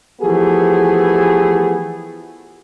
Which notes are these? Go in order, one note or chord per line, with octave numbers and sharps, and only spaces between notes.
E3 F3 A3 B3 G4 G#4